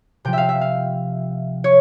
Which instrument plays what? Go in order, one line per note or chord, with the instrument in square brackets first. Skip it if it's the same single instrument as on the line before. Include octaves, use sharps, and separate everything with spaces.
[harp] C3 F3 G5
E5 F5
E5
F5
C#5